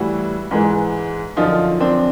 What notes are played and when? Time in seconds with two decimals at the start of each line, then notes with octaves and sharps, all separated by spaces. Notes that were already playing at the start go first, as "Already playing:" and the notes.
Already playing: A2 E3 G3 E4 F#4
0.51 G#2 E3 G#3
1.37 F#2 D3 F3 D#4 F4
1.80 C4 D4